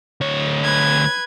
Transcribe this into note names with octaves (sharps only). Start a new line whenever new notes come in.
D2 C#5
B4 G#6